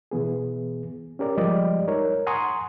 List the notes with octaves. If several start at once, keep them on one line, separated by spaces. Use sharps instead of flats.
B2 E3 B3 G#4
C#4 G4 A#4 D5
F3 G3 G#3 G4 D5 D#5
D#4 A#4 C#5
F#5 G#5 A#5 C6 C#6 D#6